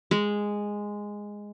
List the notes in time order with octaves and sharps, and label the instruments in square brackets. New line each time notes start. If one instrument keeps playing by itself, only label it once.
[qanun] G#3